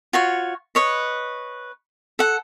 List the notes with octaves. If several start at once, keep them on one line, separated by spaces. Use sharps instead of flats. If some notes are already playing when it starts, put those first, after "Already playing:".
F4 F#4 C#5
B4 C#5 D#5
A4 F#5